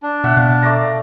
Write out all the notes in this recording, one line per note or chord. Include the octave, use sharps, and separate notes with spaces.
D4
B2 E5 F#5
B2 F5
A3 D5 A#5